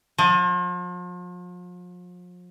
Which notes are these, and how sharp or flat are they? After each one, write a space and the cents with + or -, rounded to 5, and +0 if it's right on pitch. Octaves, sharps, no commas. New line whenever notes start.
F3 +40